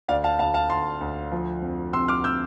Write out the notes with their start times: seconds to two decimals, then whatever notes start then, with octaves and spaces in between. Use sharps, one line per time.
0.08 D2 D5 F5
0.24 F5 A5
0.39 D2 F5 A5
0.54 F5 A5
0.69 D2 A5 C6
1.01 D2
1.32 F3
1.62 F2
1.93 C3 C6 E6
2.08 D6 F6
2.24 C3 E6 G6